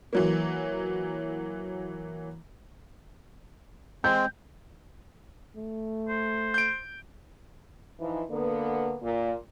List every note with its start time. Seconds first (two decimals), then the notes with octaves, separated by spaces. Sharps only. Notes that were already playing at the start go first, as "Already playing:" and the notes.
0.13 E3 F#3 A#3
4.04 G#3 C4 G6
5.56 A3
6.09 C5
6.54 G6 D7
7.99 E3 F3 D#4
8.29 D3 A#3 B3
9.01 A#2